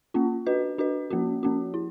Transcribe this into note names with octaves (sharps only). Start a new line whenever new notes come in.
A#3 C#4 F4
D4 F#4 B4 D#5
D4 F#4 B4 D#5
F3 A#3 C#4 F#4
F3 A#3 C#4 F#4
E4